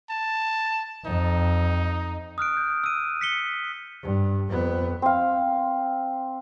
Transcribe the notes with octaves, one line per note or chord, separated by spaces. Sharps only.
A5
F2 D#4
D#6 F6 F#6 D7
G6
E6 D#7
B6 C#7 G7
G2
F2 B3
C4 F5